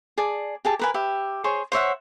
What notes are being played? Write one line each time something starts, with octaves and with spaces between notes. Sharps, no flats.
G#4 D5 A5
G4 G#4 A5
A#4 B4 G#5
G4 E5
G#4 C5 C#5 C#6
C5 C#5 E5 F#5